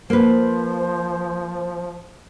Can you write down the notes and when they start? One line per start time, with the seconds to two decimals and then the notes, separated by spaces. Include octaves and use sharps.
0.10 F3 A#3 B4 C5